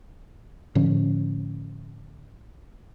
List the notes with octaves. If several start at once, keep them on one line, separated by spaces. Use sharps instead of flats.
A2 D3 F3 C#4